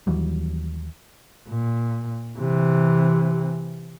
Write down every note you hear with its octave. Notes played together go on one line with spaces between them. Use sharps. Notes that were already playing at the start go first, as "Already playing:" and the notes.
D#2 E3 F#3 G3
A#2
C3 E3